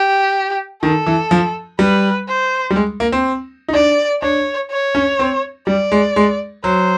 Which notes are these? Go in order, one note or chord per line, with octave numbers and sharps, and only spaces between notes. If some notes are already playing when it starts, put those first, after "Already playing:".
Already playing: G4
D#3 A4
E3
F3
G3 B4
C5
G3
G#3
A#3
C4
D#4
D4 D5
D4 C#5
C#5
C#4
C4
G3 D5
G#3
G#3
F#3 C5